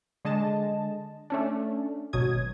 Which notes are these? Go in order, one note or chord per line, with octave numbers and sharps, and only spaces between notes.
D3 G#3 D#5 A5
A3 C#4 D4
G#1 B2 F#3 D#6 G#6